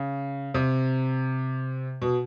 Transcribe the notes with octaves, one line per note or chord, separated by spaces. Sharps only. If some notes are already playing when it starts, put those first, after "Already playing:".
Already playing: C#3
C3
B2